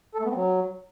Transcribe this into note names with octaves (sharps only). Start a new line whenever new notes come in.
A4
A3
B3
C4
F#3